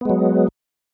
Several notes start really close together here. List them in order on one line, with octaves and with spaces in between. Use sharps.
B3 G#3 F#3